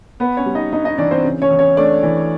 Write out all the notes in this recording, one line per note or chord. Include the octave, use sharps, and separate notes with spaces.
B3 B4
C#4 C#5
G3
D#4 D#5
G2 D#4 D#5
D#4 D#5
E3 D4 D5
C4 C5
C#3
C#4 C#5
E2
C#4 C#5
A3 D4 D5
E3